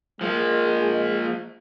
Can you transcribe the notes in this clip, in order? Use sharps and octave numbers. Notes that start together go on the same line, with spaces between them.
F3 G#3 A#3